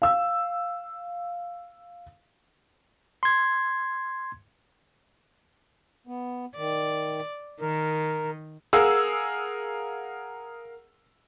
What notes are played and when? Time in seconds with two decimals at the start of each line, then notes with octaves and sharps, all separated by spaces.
0.02 F5 E6
3.23 C6 G#6
6.07 B3
6.57 D#3 D5
7.60 D#3 A#4
8.73 G#4 A#4 F5 F#5 E6